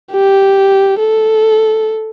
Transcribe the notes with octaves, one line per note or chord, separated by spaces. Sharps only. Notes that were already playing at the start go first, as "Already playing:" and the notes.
G4
A4